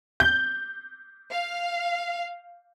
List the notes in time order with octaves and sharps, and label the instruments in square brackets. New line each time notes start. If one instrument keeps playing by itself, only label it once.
[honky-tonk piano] G6
[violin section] F5